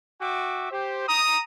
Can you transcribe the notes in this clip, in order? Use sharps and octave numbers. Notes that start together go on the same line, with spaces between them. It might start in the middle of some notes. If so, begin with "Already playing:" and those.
F#4 E5 G5 D6
G4 C5
A#5 D#6